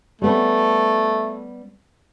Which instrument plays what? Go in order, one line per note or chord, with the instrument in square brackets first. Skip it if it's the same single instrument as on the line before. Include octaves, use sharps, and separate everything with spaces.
[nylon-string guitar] G3 B3 C#4 [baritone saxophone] A3